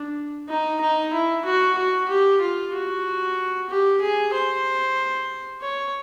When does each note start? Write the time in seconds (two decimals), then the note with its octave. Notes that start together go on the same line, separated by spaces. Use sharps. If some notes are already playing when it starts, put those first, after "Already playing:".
Already playing: D4
0.49 D#4
0.81 D#4
1.13 E4
1.45 F#4
1.78 F#4
2.09 G4
2.41 F4
2.73 F#4
3.69 G4
4.01 G#4
4.33 C5
5.62 C#5